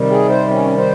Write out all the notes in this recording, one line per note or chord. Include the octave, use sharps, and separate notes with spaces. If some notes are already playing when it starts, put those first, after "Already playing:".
Already playing: C3 D#3 G3
G#4
C5
C#4
C5